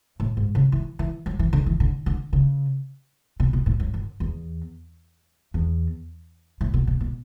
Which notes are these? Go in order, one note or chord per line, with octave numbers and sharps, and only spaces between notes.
A2
G#2
C#3
E3
E3
F#3
E3
D3
E3
D3
D3
C#3
B2
B2
A2
F#2
F#2
E2
E2
A2
B2
B2
B2